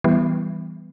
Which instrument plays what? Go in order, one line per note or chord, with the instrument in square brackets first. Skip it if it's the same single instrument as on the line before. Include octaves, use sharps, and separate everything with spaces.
[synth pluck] E3 G3 B3